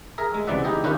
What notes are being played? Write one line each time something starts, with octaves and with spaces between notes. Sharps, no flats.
G#4 A#4 E5 A#5
G#3
C#2 C3 E3 D5 E5 F#5
D#4 E4 G4 G#4 D#5
D#3 C#4 E4 F4 G4 B4